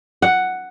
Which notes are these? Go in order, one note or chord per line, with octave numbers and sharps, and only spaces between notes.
F#5